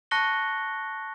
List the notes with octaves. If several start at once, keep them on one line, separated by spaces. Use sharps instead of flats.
A5 C#6 F#6 A#6 C#7 G7